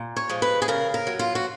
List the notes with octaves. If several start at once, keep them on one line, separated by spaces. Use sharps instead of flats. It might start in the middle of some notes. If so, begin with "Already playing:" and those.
Already playing: A#2
C#5
F3 G#3
B4
G#4
C#3 A#4
A#4
F#3
F4
F#4